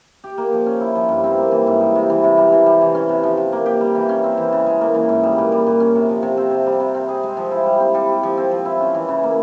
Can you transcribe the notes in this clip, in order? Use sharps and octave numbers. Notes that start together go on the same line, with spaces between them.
G4
A#3
F3
C#4
E4
F3
G2
C4
A#3
E3
G#2
G3
C3
E3
C3
G3
E3
G3
E3
C#4
C3
F3
C3
A#3
G4
G3
E3
C#4
C4
E3
C#3
G#3
A#3
E3
G#2
G3
A#2
G3
A#2
C#4
C3
F3
C3
C4
C3
G3
C3
C4
G#4
G#3
F3
E4
G3
C4
G3
G4
F3
C4
F3
E4
C#4
E3
C#3
A#3